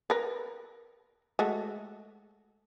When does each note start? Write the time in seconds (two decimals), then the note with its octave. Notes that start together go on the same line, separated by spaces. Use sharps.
0.10 A#4 B4
1.39 G#3 A3 F#4